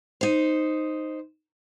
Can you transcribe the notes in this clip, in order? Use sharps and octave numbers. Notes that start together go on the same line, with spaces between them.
D#4 C5